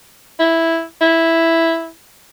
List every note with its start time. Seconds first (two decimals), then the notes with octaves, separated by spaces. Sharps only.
0.39 E4
1.01 E4